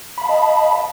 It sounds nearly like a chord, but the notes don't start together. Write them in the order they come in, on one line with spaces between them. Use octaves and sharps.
B5 F5 A5 D#5